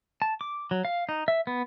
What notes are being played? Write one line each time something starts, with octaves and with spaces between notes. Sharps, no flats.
A5
D6
F#3
F5
D#4
E5
B3